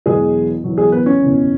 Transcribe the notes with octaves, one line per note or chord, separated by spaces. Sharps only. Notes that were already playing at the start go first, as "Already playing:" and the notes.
E1 E2 B2 F#3 G#3 G#4
E1 E2 B2 F#3
G#3 G#4
B3 B4
C#4
F#1 E2 B2